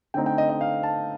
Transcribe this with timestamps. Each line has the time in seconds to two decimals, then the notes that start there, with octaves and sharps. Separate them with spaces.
0.14 D3 A3 C4 D#4 G5
0.26 G5
0.38 D#5
0.49 D#5
0.61 F5
0.83 A5